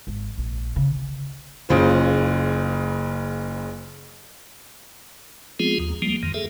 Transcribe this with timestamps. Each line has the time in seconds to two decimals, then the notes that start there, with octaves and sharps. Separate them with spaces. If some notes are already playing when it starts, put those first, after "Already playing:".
0.07 G#1
0.38 A#1
0.76 C#3
1.69 F#1 C#3 F4 C5
5.59 F3 G#3 B3 C4 F4 G#4
5.80 D#2
6.02 F3 G3 G#3 A#3
6.23 F2 D#3
6.34 G#4 A4 E5